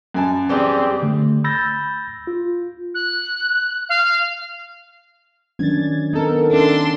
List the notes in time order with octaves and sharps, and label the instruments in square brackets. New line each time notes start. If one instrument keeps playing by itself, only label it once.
[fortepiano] F#2 G#5 A5
[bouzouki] E3 G3 G4 [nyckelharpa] C4 G#4
[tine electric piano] D3 A3
B5 E6 G6 A6 A#6
F4
[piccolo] F#6
F5
[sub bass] D#3 [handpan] F#3 C#4 D4 [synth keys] G#6 A6
[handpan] B3 C4 [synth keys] D#4 A4 A#4
[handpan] C#4 E5 [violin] D4 C6